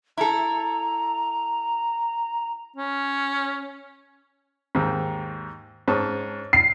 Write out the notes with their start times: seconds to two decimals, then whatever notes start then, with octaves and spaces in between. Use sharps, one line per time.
0.18 E4 A4 A#5
2.76 C#4
4.75 D#2 G#2
5.88 G#2 C#4 A5
6.53 C7